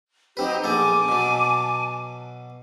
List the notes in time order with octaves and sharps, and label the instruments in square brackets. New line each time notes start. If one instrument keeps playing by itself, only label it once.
[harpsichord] F#3 C4 B4 [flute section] D#4 G4
[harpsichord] A#1 B3 A4 [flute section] G#5 A5 D6
[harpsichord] B2 F#3